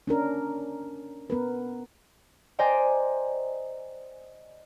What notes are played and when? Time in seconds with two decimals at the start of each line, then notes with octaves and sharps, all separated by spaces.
0.07 C#4 D4 A#4
1.30 B3 A#4 B4
2.59 C5 D5 D#5 G5 G#5 A#5